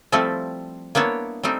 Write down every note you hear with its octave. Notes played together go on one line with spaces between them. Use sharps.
F3 G3 A3 C4 E4 A4
A#3 B3 D4 E4 C#5
G3 A3 C4 D#4